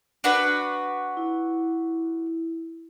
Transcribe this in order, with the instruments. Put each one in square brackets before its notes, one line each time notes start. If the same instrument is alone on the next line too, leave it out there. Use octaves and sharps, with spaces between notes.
[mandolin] D4 F#4 B4
[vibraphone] E4